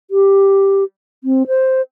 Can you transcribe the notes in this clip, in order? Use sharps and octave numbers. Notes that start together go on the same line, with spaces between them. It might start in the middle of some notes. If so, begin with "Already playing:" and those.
G4
C4
C5